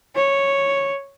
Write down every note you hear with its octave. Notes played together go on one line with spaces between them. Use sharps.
C#5